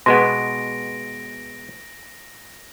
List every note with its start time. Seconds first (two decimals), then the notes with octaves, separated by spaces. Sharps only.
0.06 B2 G#3 B3 C6 A#6 D7